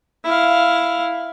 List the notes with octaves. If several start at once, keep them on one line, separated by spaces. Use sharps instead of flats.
E4 F5